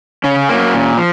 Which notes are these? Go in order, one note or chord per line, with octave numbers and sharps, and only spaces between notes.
C#3 C#4
F#3 A#3
A#2
F3